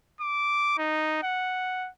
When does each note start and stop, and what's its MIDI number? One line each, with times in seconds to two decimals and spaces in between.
0.21 0.76 86
0.78 1.19 63
1.23 1.89 78